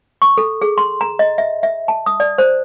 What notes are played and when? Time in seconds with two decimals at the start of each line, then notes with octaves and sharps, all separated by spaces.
0.22 C#6
0.38 A4
0.62 G#4
0.78 C6
1.01 A#5
1.19 D#5
1.38 E5
1.63 E5
1.88 A5
2.06 D#6
2.20 D5
2.38 C5